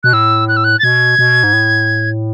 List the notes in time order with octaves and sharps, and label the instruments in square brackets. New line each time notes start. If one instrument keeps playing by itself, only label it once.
[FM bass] B2 [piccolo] F#6
[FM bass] A2 [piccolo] E6
[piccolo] F#6
E6
F#6
A6
[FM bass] B2 [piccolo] G#6
[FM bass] B2
G#2
A2